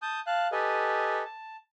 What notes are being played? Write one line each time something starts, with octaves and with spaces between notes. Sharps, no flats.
A5 D#6 G6
F5 A5 F#6
G4 A4 B4 D#5 G#5
A5